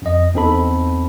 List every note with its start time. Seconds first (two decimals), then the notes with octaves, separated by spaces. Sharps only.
0.02 F2 D#5
0.34 E2 C4 D#4 A4 B5